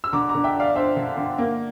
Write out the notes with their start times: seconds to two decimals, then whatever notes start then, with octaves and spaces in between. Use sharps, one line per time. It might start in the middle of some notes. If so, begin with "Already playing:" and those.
0.04 E6
0.13 D3 A#5 D6
0.29 A#5 D6
0.35 D3
0.44 E5 G5
0.56 D4 D5 F5
0.76 D4 C5 E5
0.97 D3
1.17 D3
1.38 A#3